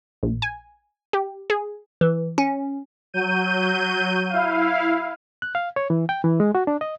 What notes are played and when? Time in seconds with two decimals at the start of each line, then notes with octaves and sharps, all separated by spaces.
0.23 A#1
0.42 G#5
1.13 G4
1.50 G#4
2.01 E3
2.38 C#4
3.14 F#3 G6 D#7
4.29 E4 F5
5.42 F#6
5.55 F5
5.76 C#5
5.90 E3
6.09 G5
6.24 E3
6.40 G#3
6.55 F#4
6.67 D4
6.81 D#5